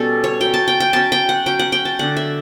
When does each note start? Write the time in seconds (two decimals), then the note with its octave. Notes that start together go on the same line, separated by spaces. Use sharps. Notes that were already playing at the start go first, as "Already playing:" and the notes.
Already playing: B2 G3 C#4 A4
0.24 C#5
0.40 F#3 C#4 G5
0.54 A5
0.68 G5
0.80 G5
0.93 F#3 C#4 A5
1.12 G5
1.29 F#5
1.46 F#3 C#4 G5
1.59 F#5
1.72 G5
1.85 A5
1.99 D3 A3 D4 F#5
2.17 E5